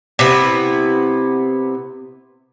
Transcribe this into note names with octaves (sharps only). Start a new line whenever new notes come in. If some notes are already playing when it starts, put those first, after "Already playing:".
C3 B3 E4